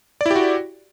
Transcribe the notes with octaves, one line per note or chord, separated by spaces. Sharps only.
E4 F#4 G4 D5